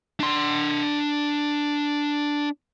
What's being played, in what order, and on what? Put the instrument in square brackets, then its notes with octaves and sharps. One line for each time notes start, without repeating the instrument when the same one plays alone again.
[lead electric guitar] D4 C6